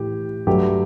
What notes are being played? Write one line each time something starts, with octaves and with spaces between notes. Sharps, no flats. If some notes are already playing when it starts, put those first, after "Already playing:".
Already playing: A2 E3 G4
G2 F#3 A3 G4